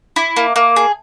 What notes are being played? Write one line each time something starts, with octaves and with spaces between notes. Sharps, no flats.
E4
A#3
A#3
G#4